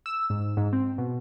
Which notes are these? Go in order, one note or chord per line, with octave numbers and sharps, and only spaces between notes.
E6
G#2
G#2
C4
B2